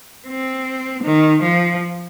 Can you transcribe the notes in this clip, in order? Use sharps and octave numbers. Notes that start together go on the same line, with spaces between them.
C4
D#3
F3